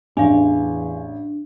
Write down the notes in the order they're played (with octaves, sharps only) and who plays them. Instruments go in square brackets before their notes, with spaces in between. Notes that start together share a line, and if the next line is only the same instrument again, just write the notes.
[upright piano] A1 [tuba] E2 [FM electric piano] D4 [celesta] F5 G#5